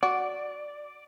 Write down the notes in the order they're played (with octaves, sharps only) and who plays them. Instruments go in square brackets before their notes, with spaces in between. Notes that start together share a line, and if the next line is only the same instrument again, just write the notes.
[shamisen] F#4 [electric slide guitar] D5